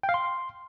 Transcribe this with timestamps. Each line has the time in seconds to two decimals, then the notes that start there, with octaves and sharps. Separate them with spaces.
0.03 G5
0.09 F5
0.14 C6